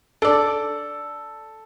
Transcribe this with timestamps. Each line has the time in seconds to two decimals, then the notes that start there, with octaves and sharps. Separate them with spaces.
0.22 D4 A4 D5